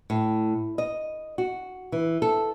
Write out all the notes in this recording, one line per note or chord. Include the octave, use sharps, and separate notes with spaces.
A2
D#5
F#4
E3
A4